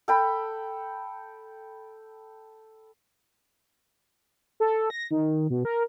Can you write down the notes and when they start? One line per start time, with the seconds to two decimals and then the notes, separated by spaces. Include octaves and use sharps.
0.08 A4 G5 B5
4.60 A4
4.90 A#6
5.11 D#3
5.50 B2
5.65 A#4